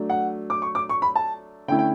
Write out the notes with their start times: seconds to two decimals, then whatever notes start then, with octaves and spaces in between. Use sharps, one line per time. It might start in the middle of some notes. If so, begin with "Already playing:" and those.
Already playing: F#3 A3 D4
0.10 F#5
0.50 D6
0.62 C#6
0.75 D6
0.89 C#6
1.02 B5
1.16 A5
1.68 D3 A3 C#4 E4 G5
1.79 G5